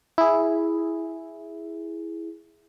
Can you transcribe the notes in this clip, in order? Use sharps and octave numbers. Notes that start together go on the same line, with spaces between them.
E4 G#4